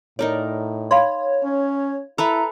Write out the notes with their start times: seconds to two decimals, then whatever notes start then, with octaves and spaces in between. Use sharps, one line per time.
0.19 A2 D#4 A#4 C#5 D5
0.91 C#5 F5 B5 C6
1.44 C#4
2.18 E4 A4 B4 E5 A#5 E6